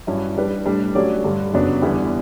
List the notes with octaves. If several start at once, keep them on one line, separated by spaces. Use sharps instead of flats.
G2 F#3 C#4 E4
G3 D4 G4 B4
A2 G3 D4
F#3 A3 C#4 G4 D5
G2 D3 G3
F#2 C#3 F#3 B3 D4
E2 D3 G3 B3 E4